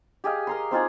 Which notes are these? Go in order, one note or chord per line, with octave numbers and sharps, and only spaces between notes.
G4 G#4 D#5 F5
A#4 A#5 C6
C4 D#4 F4 G#4